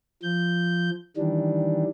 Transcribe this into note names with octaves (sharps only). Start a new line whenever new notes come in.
F3 G6
D#3 E3 G3 D4